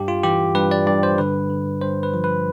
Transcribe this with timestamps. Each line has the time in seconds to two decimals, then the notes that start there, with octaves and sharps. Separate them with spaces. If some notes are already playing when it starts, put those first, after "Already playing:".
Already playing: G2 G4
0.08 F4
0.23 E3 G4
0.55 G2 B4
0.71 D5
0.87 G2 D5
1.03 C5
1.18 D3 B4
1.50 D3
1.81 G2 C5
2.03 B4
2.14 F3
2.24 B4